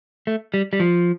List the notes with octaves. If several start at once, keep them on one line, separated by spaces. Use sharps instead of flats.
A3
G3
G3
F3